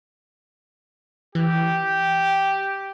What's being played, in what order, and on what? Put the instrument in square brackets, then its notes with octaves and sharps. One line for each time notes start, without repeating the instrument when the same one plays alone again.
[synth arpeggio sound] E3 [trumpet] G4